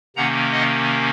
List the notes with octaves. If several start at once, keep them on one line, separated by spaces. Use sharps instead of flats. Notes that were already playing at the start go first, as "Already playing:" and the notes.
C3 D#3 A#3 C#4 F#5 A#5
D#5 F#5